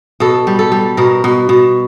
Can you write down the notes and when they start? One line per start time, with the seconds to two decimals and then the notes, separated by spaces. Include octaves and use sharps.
0.20 B2 A4
0.47 G3
0.59 A4
0.72 G3
0.97 B2 A#4
1.24 B2
1.49 B2